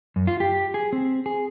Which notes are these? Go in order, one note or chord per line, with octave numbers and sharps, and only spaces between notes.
F#2
F4
G4
G#4
C4
G#4